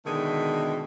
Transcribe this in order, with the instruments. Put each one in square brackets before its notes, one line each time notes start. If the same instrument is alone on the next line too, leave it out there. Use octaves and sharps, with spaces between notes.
[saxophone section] B2 D3 D#3 G#3 A3